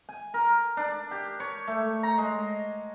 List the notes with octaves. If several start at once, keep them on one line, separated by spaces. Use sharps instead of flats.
G#5
A#4
D4
G4
C#5
A3
A#5
G#3